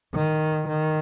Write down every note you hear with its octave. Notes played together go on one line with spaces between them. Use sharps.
D#3
D#3